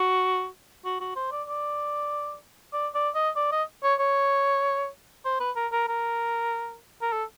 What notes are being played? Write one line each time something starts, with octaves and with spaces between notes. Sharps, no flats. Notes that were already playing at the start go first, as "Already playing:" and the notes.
Already playing: F#4
F#4
F#4
C5
D5
D5
D5
D5
D#5
D5
D#5
C#5
C#5
C5
B4
A#4
A#4
A#4
A#4
A4